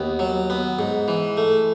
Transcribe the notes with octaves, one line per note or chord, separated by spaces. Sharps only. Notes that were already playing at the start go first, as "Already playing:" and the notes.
Already playing: D#2 B3
F#3
B3
G#2
E3
A3